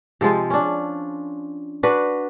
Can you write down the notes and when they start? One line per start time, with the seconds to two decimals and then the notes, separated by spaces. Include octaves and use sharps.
0.21 C3 F3 G#3 F4
0.50 C#4 D4
1.83 D4 F#4 B4